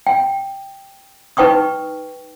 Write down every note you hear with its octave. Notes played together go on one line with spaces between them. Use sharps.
G5
D#4 B4 G5 C#6 D#6